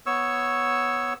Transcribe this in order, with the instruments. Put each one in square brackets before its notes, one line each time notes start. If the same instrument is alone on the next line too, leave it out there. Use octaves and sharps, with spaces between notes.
[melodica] B3 C#5 C#6 E6